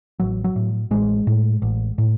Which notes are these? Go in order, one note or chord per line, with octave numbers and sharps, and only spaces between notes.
A1 F#3
F#3
A2
A1 G#3
A2
A1
A2